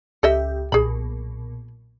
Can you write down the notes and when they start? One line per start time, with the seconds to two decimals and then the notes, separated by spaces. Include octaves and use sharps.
0.23 C#2 G4 A4 D#5 E5
0.72 B1 A#2 G#4 B5